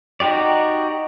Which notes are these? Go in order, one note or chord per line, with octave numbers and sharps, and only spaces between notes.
D#4 F#4 G4 D5